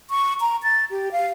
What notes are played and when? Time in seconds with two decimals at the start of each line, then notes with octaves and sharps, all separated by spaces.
0.10 C#6
0.41 A#5
0.63 A6
0.90 G4
1.12 F5